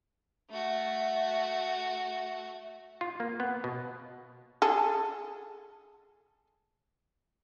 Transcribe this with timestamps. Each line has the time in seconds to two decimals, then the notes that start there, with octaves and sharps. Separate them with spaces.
0.50 A3 F#4
3.01 F4
3.20 A#3
3.40 B3
3.64 B2
4.62 G#4 A4